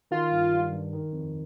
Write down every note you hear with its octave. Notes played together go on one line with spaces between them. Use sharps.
D#3 F4
G2
G3
G2
D#3
F2